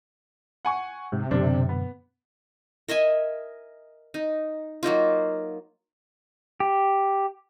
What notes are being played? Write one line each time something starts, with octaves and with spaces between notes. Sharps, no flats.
F#5 G#5 C#6
G#2 C3
F#2 B2 D3 D4 C5
B3
A#4 D#5 E5 G#5
D#4
F#3 A#3 D#4 F4
G4